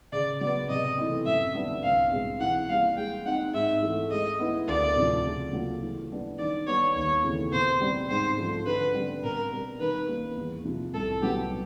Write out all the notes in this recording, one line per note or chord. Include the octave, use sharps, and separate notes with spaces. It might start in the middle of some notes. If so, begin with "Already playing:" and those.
C#3 D5
F#3 B3 D5
C3 D#5
E3 A3 C4
F#2 E5
D3 G3 B3 D4
C2 F5
B2 G#3 C4
E3 F#5
G3 A#3 F5
G#3 G5
C4 D#4 F#5
G#2 E5
E3 A3
G#3 D#5
B3 E4
D2 D5
C3 F3
C#3
F#3 A#3 C#4 F4
E3
G3 B3 D4
D#3 D5
G3 B3 C#5
D#2 C#5
C#3 E3 A3 C4
B2 C5
G3 C4
G#2 C5
F3 A3
D3 B4
G3 C4
B2 A#4
G3 C4
D#3 B4
G3 A#3 C#4
E2
C3 F3
C2 A4
B2 F#3 B3 G4